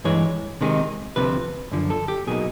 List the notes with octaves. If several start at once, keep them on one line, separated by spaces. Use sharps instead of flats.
G2 E3 G#3 C#5
C3 D#3 G#3 B3 D#4
D2 C3 F3 B4
F#2 D3 F3
A4
G4
B2 F#3 A#3 D#4 G#4